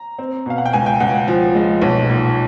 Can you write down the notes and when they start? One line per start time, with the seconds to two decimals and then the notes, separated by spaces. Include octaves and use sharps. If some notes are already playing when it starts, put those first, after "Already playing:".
Already playing: A#5
0.19 C4
0.46 B2 F5
0.58 F#5
0.66 G5
0.73 C#2 G#5
0.86 G5
1.00 C#2 F#5
1.28 F3
1.55 G#3
1.82 B1
2.09 A#2